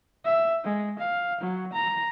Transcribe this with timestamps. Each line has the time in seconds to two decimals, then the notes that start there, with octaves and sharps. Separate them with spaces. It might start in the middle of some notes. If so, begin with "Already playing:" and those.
0.25 E5
0.64 G#3
0.99 F5
1.41 F#3
1.73 A#5